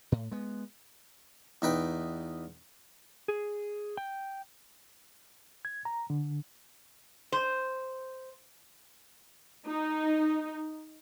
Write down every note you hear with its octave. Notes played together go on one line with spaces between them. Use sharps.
A2
G#3 B3
E2 D#4 B4 G5
G#4
G5
G#6
A#5
D3
C5
D#4